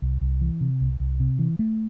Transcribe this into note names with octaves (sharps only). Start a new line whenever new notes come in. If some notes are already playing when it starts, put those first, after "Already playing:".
C2
C2
E3
C3
C2
C2
C3
E3
A3